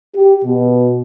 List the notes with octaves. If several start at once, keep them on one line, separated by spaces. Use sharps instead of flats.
G4
B2